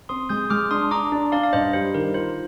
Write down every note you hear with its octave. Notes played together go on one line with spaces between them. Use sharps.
C4 C6 D#6
G#3 D#6 G6
G#3 D6 F6
D4 C6 D#6
D4 A#5 D6
D4
D4 D5 F5
F5
G2 C5 D#5
G3 C5
D#3 A#4
F4 C5